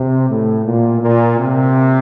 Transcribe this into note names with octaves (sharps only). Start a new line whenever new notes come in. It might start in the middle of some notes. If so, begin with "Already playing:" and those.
Already playing: C3
A2
A#2
A#2
C3